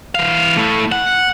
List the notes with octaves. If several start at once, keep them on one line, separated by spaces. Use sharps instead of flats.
E3 F5
A3 E4
F#5